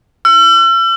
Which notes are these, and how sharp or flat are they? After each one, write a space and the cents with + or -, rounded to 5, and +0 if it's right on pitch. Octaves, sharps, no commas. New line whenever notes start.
E6 +45